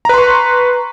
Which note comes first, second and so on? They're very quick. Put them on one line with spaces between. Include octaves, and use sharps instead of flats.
A#5 B4 C6 C#6